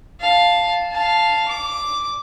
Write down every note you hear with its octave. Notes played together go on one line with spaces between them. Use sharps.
F5 A5
F5 A5
D6